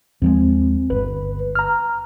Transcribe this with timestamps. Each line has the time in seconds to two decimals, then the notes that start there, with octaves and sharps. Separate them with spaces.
0.22 D#2 F3 G#3 C4
0.90 G1 B4
1.55 A#5 F6